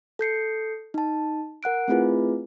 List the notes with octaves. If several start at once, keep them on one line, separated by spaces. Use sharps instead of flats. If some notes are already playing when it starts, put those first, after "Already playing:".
A4 G6 C7 C#7
D#4 A5
A#4 F#5 F#6 D7
A3 C4 E4 F4 G#4 B4